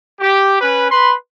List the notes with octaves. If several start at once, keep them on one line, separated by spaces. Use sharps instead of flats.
G4
C#4 B4
B4 B5 C6